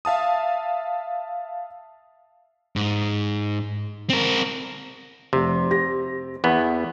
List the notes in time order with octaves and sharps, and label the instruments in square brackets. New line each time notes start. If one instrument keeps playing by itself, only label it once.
[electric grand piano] E5 F5 A5 D#6
[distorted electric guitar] G#2
C4 A#4
[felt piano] F1 [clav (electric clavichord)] C3
[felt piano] G4 A#6
[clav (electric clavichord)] E2 B3 [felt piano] B5